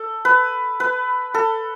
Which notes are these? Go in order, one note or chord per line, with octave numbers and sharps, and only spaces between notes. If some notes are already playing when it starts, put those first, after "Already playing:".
Already playing: A4
B4
B4
A4